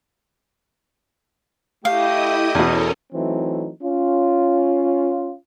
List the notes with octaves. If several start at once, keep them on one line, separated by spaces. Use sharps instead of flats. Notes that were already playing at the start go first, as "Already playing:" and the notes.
A3 E4 G4 D#5 F5 D#6
E2 B2 C#4 A4 A#4
E3 F#3 A3 C4 D#4
C#4 F4